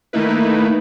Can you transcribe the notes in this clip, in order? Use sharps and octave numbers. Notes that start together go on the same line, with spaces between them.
D#3 A3 A#3 D#4 E4 B4